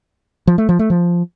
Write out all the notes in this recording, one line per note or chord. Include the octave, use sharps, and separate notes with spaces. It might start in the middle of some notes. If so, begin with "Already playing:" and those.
F3
A3
F3
A3
F3